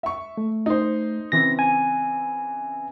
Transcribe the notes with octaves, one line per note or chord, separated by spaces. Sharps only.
E5 C#6
A3
D#4 C5
C#3 E3 C4 A#6
G#5